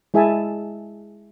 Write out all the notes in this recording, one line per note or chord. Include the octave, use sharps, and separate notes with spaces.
G#3 E4 G#4 E5 G#5 A5